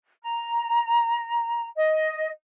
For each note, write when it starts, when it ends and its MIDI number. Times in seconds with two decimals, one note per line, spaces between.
0.22 1.66 82
1.76 2.28 75